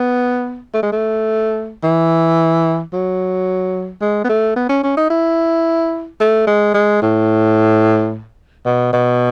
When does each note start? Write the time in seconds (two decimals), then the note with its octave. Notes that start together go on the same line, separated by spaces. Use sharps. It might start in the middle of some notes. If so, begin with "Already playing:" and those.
Already playing: B3
0.74 A3
0.83 G#3
0.92 A3
1.84 E3
2.93 F#3
4.01 G#3
4.24 B3
4.29 A3
4.56 B3
4.69 C#4
4.84 C#4
4.97 D#4
5.10 E4
6.20 A3
6.47 G#3
6.74 G#3
7.02 A2
8.66 B2
8.93 B2